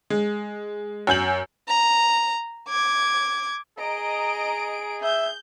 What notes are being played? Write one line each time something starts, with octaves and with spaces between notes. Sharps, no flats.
G#3
F#2 G#5 G6 F#7
A#5
D6 G#6
G#4 D#5 A#5 D7
E5 G6